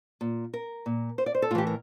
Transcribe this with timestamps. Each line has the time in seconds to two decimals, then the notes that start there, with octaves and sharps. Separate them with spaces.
0.21 A#2
0.54 A#4
0.86 A#2
1.18 C5
1.26 D5
1.35 C5
1.42 A4
1.51 A2 F4
1.55 E3 G4
1.67 A#4